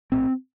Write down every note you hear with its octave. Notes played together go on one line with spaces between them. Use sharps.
A#1 A2 C4